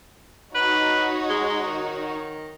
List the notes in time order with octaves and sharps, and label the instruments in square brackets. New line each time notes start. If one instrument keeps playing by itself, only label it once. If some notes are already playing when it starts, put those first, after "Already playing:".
[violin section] D#4 F#4 C#5 [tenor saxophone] B4
[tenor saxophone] G#3
D#3